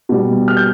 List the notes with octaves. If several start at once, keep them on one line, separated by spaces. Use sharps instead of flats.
B2 G3
F6
G6